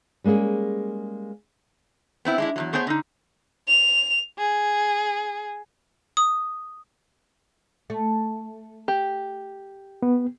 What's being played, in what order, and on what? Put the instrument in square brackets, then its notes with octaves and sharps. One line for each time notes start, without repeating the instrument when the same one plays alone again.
[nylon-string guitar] G3 G#3 A#3 C#4 G#4
[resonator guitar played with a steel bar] B3 C4 E4
G#3 D4 E4
E2 G#2 F#3
A3 B3 G#4 C5 C#5
D3 D#4
[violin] F7
G#4
[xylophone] D#6
[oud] A3
[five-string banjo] G4
[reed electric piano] B3